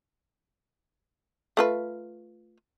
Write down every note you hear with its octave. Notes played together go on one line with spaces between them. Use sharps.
A3 F4 B4